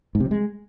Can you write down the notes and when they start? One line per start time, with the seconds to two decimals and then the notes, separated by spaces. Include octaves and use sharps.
0.15 G#2
0.20 C3
0.26 F#3
0.31 G#3